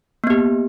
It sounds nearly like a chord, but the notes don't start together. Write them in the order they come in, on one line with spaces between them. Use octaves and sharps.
A#3 B3 G4